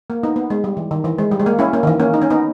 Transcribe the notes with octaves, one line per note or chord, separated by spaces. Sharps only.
A#3
B3 D#4
B3
G#3
G3
E3
D#3
E3
G#3
G3
G#3
A#3
C#4 E4
A#3 C#4
D#3
E3
A#3 C#4
D#4
C#4
B3 D#4